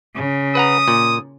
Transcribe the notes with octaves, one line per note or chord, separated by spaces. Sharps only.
C#3
B4 F#5 A#5 D#6
A#2